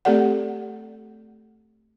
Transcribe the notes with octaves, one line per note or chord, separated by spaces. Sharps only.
A3 C4 G4 A4 D5 F#5